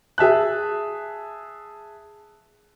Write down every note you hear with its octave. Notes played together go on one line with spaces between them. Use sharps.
G#4 E5 A5 F#6